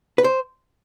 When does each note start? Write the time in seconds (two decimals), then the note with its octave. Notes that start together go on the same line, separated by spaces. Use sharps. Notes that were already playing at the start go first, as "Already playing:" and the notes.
0.18 B4
0.24 C5